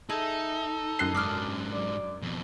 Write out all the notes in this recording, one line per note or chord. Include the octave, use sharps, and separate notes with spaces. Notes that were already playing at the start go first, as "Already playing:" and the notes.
D#4 E4 G#4 A4
F#2 D#5 F#6 C7
G#2 D4 D6 D#6 F6
D5
F2 B2